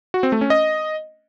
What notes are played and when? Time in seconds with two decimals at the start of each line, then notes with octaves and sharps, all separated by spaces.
0.14 F#4
0.23 C4
0.32 A3
0.41 C#4
0.50 D#5